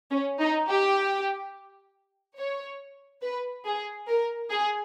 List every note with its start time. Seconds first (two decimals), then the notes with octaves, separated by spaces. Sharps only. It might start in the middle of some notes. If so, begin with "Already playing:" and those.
0.11 C#4
0.40 D#4
0.68 G4
2.38 C#5
3.22 B4
3.65 G#4
4.08 A#4
4.51 G#4